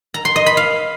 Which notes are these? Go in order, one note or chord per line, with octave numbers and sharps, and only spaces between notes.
A#5
C6
D#5
B5
F5